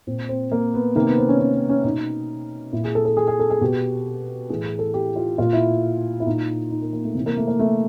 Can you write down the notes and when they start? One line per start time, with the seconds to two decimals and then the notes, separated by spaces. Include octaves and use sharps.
0.07 A#2 C4
0.29 C4
0.52 A#3
0.74 B3
0.95 C3 D#3 A#3
1.07 B3
1.18 C4
1.29 C#4
1.39 C#4
1.54 B3
1.69 C#4
1.84 B2 D#4
2.73 A#2 E4
2.84 G#4
2.95 A4
3.05 A4
3.17 G#4
3.28 G#4
3.39 A4
3.50 G#4
3.61 B2 G4
4.50 A2 E3 G#4
4.64 G#4
4.79 A4
4.94 G4
5.16 F4
5.38 A#2 F4
5.53 E4
6.20 E4
6.26 A#2 D#4
6.70 D#4
6.82 A#3
6.93 A#3
7.04 A3
7.15 C3 E3
7.26 A#3
7.37 A3
7.48 A#3
7.59 A3